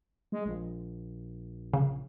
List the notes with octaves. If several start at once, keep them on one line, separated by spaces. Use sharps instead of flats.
G#3
A#1
C#3